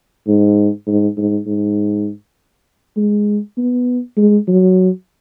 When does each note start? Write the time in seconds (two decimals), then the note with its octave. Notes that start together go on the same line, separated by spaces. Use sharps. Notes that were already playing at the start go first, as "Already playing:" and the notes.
0.27 G#2
0.87 G#2
1.17 G#2
1.46 G#2
2.96 G#3
3.57 B3
4.17 G#3
4.48 F#3